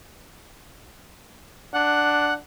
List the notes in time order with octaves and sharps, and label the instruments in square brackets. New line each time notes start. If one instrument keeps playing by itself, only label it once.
[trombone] D4 [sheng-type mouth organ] F#5